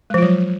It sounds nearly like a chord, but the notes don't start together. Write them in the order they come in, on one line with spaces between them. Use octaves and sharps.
G#3 F3 F4 F#3